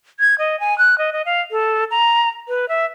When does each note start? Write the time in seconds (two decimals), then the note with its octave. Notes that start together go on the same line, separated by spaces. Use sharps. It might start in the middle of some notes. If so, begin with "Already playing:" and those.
0.20 G#6
0.39 D#5
0.60 G#5
0.78 F#6
0.98 D#5
1.13 D#5
1.26 F5
1.51 A4
1.91 A#5
2.48 B4
2.69 E5